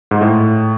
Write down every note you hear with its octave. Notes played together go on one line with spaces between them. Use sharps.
G#2
A2